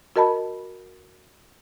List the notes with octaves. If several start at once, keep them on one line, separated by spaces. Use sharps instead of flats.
F#4 A#4 D#5 A5 B5